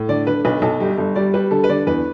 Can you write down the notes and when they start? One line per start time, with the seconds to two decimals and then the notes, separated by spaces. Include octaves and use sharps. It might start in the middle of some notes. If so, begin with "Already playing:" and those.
Already playing: A2
0.09 D3 D5
0.27 D3 B4
0.45 B1 B4
0.62 B1 A4
0.80 G1 G4
0.98 G1 A4
1.15 G3 D5
1.34 G3 B4
1.51 D3 A4
1.64 B4
1.69 D3 D5
1.87 E2 B4